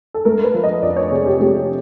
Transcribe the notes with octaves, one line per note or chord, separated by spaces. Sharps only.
A4
A3 A#4
B4
F3
D#5
F2 D5
C#5
C3 G#4
G4
A3 G4